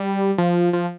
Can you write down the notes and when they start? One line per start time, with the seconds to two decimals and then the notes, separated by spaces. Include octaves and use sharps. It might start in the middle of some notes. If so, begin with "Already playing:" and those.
Already playing: G3
0.38 F3
0.73 F3